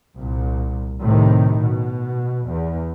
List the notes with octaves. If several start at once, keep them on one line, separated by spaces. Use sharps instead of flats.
C2 A#2
A2 C3 D#3
B2
E2